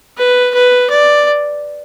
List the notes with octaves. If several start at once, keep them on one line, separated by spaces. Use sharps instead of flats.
B4
B4
D5